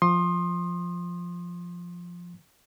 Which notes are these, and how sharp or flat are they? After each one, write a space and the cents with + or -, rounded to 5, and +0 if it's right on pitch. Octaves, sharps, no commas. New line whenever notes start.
F3 +0 C6 +25 D#6 -20